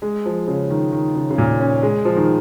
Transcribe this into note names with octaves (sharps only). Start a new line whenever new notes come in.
G#3
F3
C#3
D#3
D#3
C#3
C#3
A#2
C#4
G#3
F3
D#3